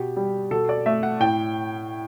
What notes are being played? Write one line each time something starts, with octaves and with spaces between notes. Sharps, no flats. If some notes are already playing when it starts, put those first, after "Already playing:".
Already playing: B2 G4
G3
B2 A4
D5
A3 E5
F#5
A2 G5